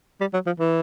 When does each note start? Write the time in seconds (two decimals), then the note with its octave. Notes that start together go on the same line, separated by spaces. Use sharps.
0.21 G3
0.34 F#3
0.47 F3
0.60 E3